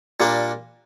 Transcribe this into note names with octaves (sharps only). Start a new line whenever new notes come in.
A#2 G3 A#3 D4